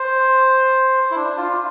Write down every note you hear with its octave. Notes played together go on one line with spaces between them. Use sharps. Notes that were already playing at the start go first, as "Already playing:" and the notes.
Already playing: C5
E4
D4
F4